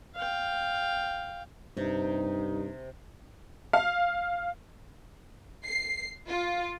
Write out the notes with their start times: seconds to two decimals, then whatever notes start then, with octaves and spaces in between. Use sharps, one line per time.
0.15 F5 G5
1.77 G2 C3 D#4
3.73 F5
5.64 C7
6.28 F4